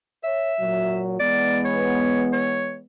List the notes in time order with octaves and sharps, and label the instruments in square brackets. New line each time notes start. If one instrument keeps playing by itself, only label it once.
[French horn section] C#5 [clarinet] E5
[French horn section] A#2 F#3
[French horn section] E3 G#3 B3 [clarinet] D5
[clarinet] C#5
C#5